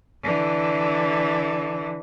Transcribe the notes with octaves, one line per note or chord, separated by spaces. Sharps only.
D3 E3